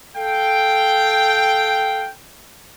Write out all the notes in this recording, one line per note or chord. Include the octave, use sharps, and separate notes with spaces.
A4 F5 G5